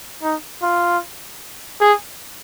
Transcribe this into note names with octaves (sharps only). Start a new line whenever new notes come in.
D#4
F4
G#4